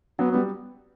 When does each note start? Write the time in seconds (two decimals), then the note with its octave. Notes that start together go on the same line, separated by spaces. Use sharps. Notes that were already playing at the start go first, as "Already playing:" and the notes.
0.19 F#3 B3
0.32 G3 B3